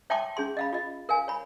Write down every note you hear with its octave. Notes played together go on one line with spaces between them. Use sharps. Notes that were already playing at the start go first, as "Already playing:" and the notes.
C#5 E5 G5 A5 C6 D6
C#4 G#4 C6
D#5 F5 B5
F4 D#5
A#4 F5 G#5
C#5 B5